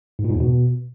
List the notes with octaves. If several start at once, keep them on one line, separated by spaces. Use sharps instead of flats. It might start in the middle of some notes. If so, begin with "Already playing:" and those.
G#2
A#2
G#2
E2
B2